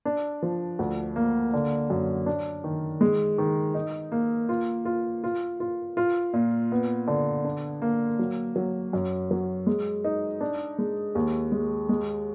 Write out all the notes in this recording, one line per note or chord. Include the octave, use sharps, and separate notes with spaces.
D4
F3
D2
A#3
D3
F#2
D4
D#3
G#3
D#3
D#4
A#3
F4
F4
F4
F4
F4
A#2
B3
D3
D4
A#3
F#3
F#3
F#2
F#3
G#3
D#4
D4
G#3
D#2
G#3
G#3